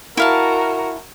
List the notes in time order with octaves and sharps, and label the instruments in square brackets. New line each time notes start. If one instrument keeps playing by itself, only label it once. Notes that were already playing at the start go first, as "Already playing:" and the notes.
[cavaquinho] E4 F5 A5 [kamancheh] F#4 A#4